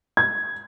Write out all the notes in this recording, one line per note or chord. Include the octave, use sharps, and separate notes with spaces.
G#6